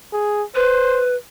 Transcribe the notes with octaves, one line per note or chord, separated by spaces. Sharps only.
G#4
B4 C5